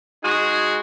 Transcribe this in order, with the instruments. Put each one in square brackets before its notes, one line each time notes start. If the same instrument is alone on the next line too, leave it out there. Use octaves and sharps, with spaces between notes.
[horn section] G#3 D#4 F#4 G#4